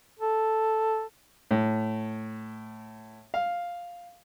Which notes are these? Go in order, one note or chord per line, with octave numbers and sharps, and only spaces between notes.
A4
A2
F5